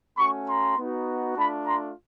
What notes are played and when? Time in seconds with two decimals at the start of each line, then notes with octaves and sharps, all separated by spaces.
0.18 A3 C#4 F#4 B5 C#6
0.48 A#5 C6
0.78 B3 D#4 F#4
1.36 A3 D4 F4 A5 B5
1.66 A#5 C6